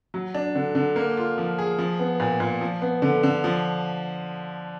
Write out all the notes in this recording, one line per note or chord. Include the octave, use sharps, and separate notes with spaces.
F#3
D4
D3
D3
A#3
F4
F3
G#4
F3
B3
A#2
A#2
F3
B3
D3
D3
F3